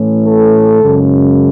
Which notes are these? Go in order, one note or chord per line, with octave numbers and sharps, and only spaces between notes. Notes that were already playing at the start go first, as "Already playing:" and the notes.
Already playing: A2 E3 A3 C#4
A4
F#2 C#3 G#3